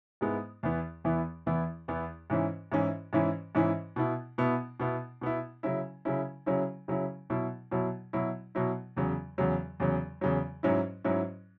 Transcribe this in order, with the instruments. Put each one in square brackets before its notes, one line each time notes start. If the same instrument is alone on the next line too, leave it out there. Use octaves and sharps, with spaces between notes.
[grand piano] G#2 G#3 B3 E4
E2 E3 B3 E4
E2 E3 B3 E4
E2 E3 B3 E4
E2 E3 B3 E4
G#2 E3 C#4 E4
G#2 E3 C#4 E4
G#2 E3 C#4 E4
G#2 E3 C#4 E4
B2 B3 E4
B2 B3 E4
B2 B3 E4
B2 B3 E4
C#3 F#3 C#4 E4
C#3 F#3 C#4 E4
C#3 F#3 C#4 E4
C#3 F#3 C#4 E4
B2 F#3 E4
B2 F#3 E4
B2 F#3 E4
B2 F#3 E4
E2 C#3 F#3
E2 C#3 F#3
E2 C#3 F#3
E2 C#3 F#3
G#2 F#3 C#4 E4
G#2 F#3 C#4 E4